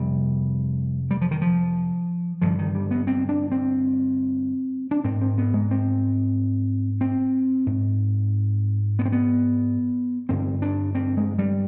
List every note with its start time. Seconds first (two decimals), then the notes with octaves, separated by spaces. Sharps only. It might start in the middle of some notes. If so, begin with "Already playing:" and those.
Already playing: F2 C3 G3
1.11 G3
1.21 F3
1.31 D#3
1.42 F3
2.42 G2 D3 F3
2.59 D#3
2.75 G3
2.91 B3
3.07 C4
3.29 D4
3.52 C4
4.91 D4
5.04 G#2 C4
5.21 C4
5.38 B3
5.54 G#3
5.71 C4
7.01 C4
7.67 G#2
8.99 B3
9.05 C4
9.12 B3
10.29 G2 D3 C4
10.62 D4
10.95 C4
11.17 G#3
11.39 G3